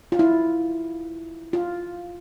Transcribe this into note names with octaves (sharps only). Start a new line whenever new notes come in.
F4
E4
F4